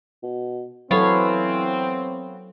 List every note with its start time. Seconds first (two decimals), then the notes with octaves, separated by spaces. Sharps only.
0.23 B2
0.91 E3 F#3 B3 C4 A4 C#5 F5